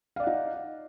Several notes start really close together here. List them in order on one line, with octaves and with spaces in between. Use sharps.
F5 D5 F#5 D#4